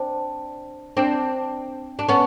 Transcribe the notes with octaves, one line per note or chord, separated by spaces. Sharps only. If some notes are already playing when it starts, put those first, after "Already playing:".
Already playing: C4 D4
C4 D4
D4
B3 C#4